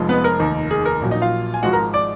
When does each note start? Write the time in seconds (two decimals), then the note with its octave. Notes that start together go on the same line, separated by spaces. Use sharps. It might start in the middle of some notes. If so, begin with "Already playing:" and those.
Already playing: F1 F2 F3 G#3
0.09 B3 B4
0.24 A#4
0.39 F1 D#2 D#3
0.71 G#4
0.86 A#4
1.01 A#1 A#2 F#3
1.11 D#4 D#5
1.22 F4 F5
1.54 G#5
1.63 G#1 G#2 F3 G#3 F#4 F#5
1.73 A#4 A#5
1.94 D5 D6